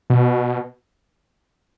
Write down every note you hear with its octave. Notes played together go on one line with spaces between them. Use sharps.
B2